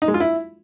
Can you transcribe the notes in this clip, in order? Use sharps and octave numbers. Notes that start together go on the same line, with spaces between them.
D#4
G#3
F4
E4